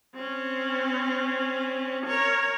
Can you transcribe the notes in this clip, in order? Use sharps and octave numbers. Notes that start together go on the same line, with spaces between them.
C4 C#4
A#4 C#5